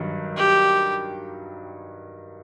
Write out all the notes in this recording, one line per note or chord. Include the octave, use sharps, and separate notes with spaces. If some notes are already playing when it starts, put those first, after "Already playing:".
Already playing: G2 D#3 F#3
G4